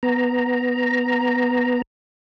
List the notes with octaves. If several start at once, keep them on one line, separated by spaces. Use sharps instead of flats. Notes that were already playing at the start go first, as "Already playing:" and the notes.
B3 A#5